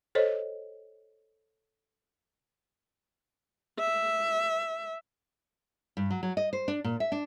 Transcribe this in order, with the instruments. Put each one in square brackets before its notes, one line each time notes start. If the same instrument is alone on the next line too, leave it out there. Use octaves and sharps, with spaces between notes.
[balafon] A4 C5 C#5 D#5
[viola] E5
[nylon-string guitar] G2
F#3
F#3
D#5
C5
D4
A#2
E5
D4